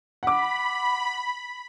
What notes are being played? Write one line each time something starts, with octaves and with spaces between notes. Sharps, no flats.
F#5 B5 D6